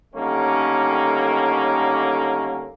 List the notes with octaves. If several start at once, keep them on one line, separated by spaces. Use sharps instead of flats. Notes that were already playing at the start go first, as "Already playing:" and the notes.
D3 D#3 G3 A3 A#3 C#4